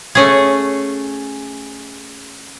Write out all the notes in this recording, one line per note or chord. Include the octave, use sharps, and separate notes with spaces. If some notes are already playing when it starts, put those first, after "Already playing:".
A3 C#4 G#4